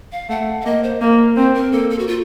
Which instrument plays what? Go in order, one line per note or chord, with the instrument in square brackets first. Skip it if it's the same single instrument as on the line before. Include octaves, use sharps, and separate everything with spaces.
[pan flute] F5
[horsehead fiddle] A3 [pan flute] F#5
[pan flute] F5
[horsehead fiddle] A#3 [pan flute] D#5
[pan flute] C5
[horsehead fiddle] A#3 [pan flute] A#4
[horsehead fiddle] C4 [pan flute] C5
[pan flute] A#4
[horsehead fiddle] A#3 [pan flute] A4
[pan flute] A4
F#4
F4